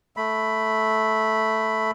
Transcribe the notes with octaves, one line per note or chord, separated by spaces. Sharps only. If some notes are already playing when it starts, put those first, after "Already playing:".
A3 B5